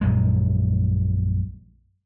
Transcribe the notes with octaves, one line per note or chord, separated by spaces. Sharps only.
A#1 F#2 G#3